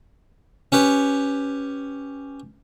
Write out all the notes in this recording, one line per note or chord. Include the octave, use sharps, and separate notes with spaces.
C#4 G4 B4